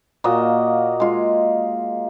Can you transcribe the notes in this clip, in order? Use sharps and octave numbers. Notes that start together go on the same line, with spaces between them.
A#2 A#3 F#4 D#5
G#3 F4